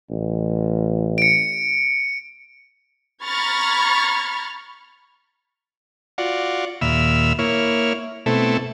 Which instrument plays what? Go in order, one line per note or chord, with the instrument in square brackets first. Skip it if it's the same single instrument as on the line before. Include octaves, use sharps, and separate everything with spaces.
[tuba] A1
[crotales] C#7 D7
[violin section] A#5 B5 C#6 F6 G#6 A6
[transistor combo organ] F4 F#4 D5
D#2 A#2 E5 B5 E6 F6
A#3 E4 C#5 F6
B2 A3 C4 E4 A4